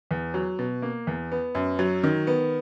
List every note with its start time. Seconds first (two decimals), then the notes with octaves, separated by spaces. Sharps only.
0.11 E2
0.34 F#3
0.59 B2
0.82 A#3
1.07 E2
1.32 B3
1.55 F#2
1.79 F#3
2.04 D#3
2.27 B3